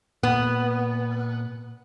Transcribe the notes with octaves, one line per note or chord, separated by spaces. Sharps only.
A#2 B3